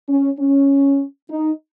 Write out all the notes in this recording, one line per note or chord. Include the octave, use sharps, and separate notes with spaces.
C#4
C#4
D#4